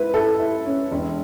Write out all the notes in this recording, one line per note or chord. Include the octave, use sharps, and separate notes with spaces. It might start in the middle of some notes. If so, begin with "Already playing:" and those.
Already playing: G#2 E4 B4
E4 A4
E4
C#4
E1